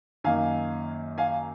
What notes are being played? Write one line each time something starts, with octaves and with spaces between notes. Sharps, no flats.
F#2 D#3 A#3 F5 G#5
F5 G#5